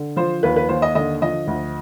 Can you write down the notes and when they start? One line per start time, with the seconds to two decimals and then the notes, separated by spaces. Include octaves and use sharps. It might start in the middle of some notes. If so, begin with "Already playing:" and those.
Already playing: D3
0.16 F3 C5
0.43 D#2 B4
0.56 B4
0.69 D#2 C5
0.82 D#5
0.95 D3 D#5
1.22 F3 D#5
1.47 D2